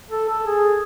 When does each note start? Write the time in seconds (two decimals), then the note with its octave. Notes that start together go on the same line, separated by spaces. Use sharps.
0.10 A4
0.29 A4
0.47 G#4